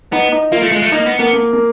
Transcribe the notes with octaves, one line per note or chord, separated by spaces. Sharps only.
B3 D#4
D#4
A#3 F4
A3
G#3
A3
A#3 D#4
B3
A#3 B3
A#3
A#3